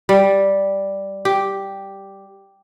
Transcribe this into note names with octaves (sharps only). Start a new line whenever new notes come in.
G3
G4